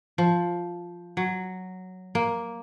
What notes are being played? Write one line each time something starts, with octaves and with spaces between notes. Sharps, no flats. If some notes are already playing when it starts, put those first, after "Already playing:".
F3
F#3
A#3